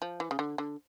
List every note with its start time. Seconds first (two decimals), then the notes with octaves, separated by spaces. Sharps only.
0.02 F3
0.20 E3
0.31 C#3
0.39 D3
0.58 D3